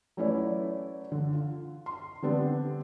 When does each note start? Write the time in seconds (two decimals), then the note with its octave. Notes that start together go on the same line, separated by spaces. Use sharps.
0.17 F#3 A3 C#4 E4 B4 D5
1.12 D3
1.33 F4
1.86 C6
2.22 D3 G3 B3 C4 D4